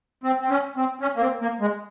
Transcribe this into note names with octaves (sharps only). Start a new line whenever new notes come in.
C4
C4
C#4
C4
C#4
A#3
C4
A#3
G#3